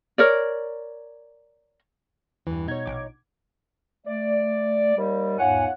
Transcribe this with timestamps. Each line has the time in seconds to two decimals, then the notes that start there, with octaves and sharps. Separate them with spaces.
0.18 A#4 C#5 D5
2.47 E2 G2 E3
2.68 B2 D#4 C#5 G#6
2.86 A#1 D6
4.07 A3 D5
4.97 D#2 G3
5.39 E2 G#2 F4 C#5 F#5 G#5